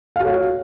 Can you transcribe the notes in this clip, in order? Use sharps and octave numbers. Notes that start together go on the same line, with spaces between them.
F#4 C#5 F5